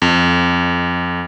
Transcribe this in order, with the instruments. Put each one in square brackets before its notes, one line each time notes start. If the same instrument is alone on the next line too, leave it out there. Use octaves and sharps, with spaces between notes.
[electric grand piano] F2